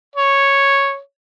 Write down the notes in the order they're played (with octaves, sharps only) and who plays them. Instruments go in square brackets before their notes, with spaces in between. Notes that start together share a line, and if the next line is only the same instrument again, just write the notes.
[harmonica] C#5